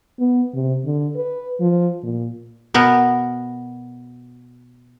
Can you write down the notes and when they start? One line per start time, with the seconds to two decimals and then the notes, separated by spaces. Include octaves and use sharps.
0.20 B3
0.55 C3
0.85 D3
1.16 B4
1.60 F3
2.04 A#2
2.74 B2 B3 A#4